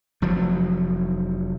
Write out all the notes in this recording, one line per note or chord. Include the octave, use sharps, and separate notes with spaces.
F1 F3 F#3